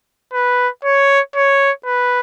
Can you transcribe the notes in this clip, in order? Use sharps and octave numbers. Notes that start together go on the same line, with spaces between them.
B4
C#5
C#5
B4